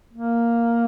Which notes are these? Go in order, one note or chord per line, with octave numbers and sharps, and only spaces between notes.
A#3